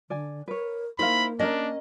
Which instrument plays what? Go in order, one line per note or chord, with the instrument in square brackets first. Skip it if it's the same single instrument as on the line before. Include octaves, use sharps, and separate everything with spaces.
[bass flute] D3 [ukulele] D5 G#5
[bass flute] A#4 [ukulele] B4 C#5
[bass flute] A#3 [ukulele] D#4 F5 [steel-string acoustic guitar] E4 A#4 C5 [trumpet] B5
[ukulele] C#4 A#4 [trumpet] D4 [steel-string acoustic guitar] D#5